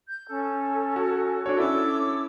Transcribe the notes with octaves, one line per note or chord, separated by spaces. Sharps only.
G6
C#4 A4
F#4
D4 F#4 C#5
C#4 E4 A4 D6 E6